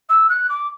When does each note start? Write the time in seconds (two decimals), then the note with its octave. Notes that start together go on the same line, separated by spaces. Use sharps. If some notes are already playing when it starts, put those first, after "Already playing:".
0.09 E6
0.29 F#6
0.49 D6